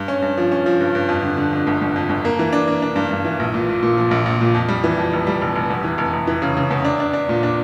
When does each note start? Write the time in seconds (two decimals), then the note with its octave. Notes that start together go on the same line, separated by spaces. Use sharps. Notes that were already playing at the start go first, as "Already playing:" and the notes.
Already playing: G2
0.08 C#4
0.22 G2
0.37 F3
0.52 C#4
0.66 F3
0.81 G2
0.95 G2
1.09 F2
1.23 D3
1.37 D3
1.53 F2
1.67 G1
1.81 G1
1.96 F2
2.09 G1
2.25 A#3
2.39 E3
2.53 D4
2.68 A#3
2.82 D4
2.96 G2
3.11 G2
3.25 E3
3.39 A#1
3.54 A#2
3.69 A#2
3.83 A#2
3.97 F3
4.11 A#1
4.26 A#1
4.41 A#2
4.54 F2
4.69 G3
4.84 E3
4.98 F2
5.13 F1
5.27 G3
5.42 F1
5.56 F1
5.70 E2
5.84 E3
5.98 F1
6.13 F1
6.27 E3
6.42 C#3
6.57 C#3
6.71 E2
6.85 D4
7.00 D4
7.13 D4
7.29 A#2
7.43 D4